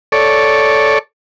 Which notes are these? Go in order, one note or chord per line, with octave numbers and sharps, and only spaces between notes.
A4 C#5 D5